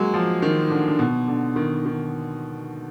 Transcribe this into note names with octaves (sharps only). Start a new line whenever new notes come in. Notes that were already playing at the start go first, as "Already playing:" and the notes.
Already playing: F#3 G#3 A#3
F3
D#3
D3
D3
B2
D3
D#3
D#3